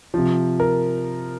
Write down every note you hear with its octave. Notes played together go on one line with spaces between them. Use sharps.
C3 F3
A#4